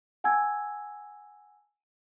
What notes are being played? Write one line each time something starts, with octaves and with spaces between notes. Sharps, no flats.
F#5 G#5 A5 E6 G#6